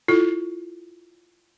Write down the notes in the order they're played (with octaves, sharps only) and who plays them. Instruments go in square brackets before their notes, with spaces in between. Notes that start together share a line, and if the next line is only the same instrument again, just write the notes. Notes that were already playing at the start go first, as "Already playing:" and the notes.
[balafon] E4 F4 A4